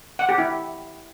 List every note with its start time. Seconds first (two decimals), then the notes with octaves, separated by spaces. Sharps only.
0.19 F#5
0.29 G4
0.38 E4